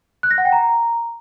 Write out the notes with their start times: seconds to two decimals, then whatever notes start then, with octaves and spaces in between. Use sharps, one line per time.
0.23 F#6
0.31 A#6
0.38 F#5
0.45 G5
0.52 A#5